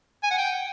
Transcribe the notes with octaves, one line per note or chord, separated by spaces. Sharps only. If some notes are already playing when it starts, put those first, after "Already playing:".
G#5
F#5
G5